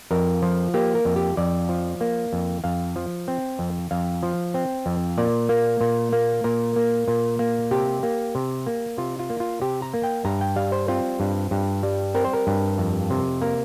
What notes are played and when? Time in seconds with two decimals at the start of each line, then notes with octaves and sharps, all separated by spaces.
0.11 F2 A#4
0.42 F3
0.74 A#3 G4
0.95 A#4
1.05 F2
1.16 G4
1.37 F2 D5
1.69 F3
2.01 A#3
2.33 F2
2.64 F2 F5
2.96 F3
3.28 C4
3.59 F2
3.91 F2 F5
4.23 F3
4.54 C4
4.86 F2
5.18 A#2 D5
5.49 A#3
5.81 A#2
6.13 A#3
6.44 A#2 A#4
6.76 A#3
7.08 A#2
7.39 A#3
7.71 C3 G4
8.03 A#3
8.35 C3
8.66 A#3
8.98 C3 F4
9.19 F4
9.30 A#3
9.40 F4
9.62 C3 G4
9.82 A#5
9.94 A#3
10.04 G5
10.25 G2 A#5
10.41 G5
10.56 G3 F5
10.72 C5
10.88 C4 F4
11.20 G2
11.51 G2
11.83 G3
12.15 C4 A#4
12.25 C5
12.33 A#4
12.47 G2
12.78 F2
13.10 C3
13.41 A#3 A#4